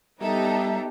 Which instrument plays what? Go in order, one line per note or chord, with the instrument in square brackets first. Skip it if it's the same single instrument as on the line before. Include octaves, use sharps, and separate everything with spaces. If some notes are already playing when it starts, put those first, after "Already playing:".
[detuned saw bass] G3 [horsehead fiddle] B3 G4 [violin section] D#4 A4 A#5 [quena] E5